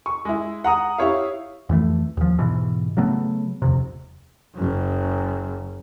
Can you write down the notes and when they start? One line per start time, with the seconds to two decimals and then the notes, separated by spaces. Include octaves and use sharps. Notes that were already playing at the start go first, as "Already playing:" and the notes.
0.06 C#6
0.25 G#3 E4
0.64 F#5 A#5 D#6
0.98 E4 G4 C#5 F5
1.69 F2 E3 A3
2.17 D#2 F3
2.39 G#2 B2 E3
2.97 C#3 F#3 A3 B3
3.62 D#1 F2 C3
4.54 F#1 F#2